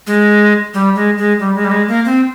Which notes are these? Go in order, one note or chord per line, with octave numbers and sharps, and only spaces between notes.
G#3
G3
G#3
G#3
G3
G#3
G3
G#3
A#3
C4